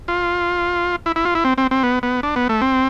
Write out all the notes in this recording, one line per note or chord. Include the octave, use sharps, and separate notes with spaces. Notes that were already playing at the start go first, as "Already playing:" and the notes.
F4
E4
E4
F4
E4
C4
C4
C4
B3
B3
D4
B3
A3
C4